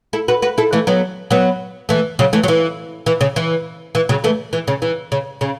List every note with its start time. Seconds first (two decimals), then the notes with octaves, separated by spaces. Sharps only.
0.13 E4 A4
0.28 F#4 B4
0.42 F#4 B4
0.58 E4 A4
0.73 E3 A3
0.87 F#3 B3
1.31 F#3 B3
1.89 E3 A3
2.19 C#3 F#3
2.33 E3 A3
2.43 F#3
2.48 E3
3.06 E3
3.21 C#3
3.36 E3
3.95 E3
4.09 C#3 F#3
4.24 E3 A3
4.53 E3
4.68 C#3
4.82 E3
5.12 C#3
5.41 C#3